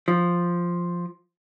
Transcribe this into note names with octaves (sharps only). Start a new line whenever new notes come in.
F3